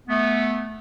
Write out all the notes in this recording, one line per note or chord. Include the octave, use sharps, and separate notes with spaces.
A3 B3